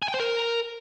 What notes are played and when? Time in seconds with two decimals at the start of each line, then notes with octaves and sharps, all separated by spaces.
0.03 G#5
0.08 G5
0.14 C5
0.20 A#4